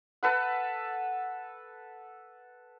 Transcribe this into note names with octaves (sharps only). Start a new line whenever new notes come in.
A4 B4 F#5